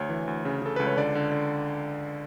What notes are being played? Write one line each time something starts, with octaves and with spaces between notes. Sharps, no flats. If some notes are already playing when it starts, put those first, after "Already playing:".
Already playing: D2 C#5
E3
D2
C#3
C#3 A4
C#2 B4
C#5
D3 D5
D3
D3